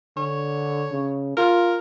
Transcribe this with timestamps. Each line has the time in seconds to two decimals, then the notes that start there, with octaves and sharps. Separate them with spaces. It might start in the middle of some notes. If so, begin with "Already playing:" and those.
0.17 D3 C#5
0.92 C#3
1.37 F4 A#4